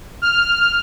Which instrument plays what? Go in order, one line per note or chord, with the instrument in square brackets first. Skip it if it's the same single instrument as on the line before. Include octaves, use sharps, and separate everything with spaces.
[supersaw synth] F6